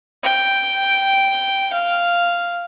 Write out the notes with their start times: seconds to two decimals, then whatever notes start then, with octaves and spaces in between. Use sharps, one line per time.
0.23 G5
1.73 F5